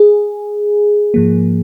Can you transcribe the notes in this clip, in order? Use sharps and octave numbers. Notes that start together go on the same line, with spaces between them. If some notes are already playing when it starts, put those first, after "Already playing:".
Already playing: G#4
G#2 F3 A#3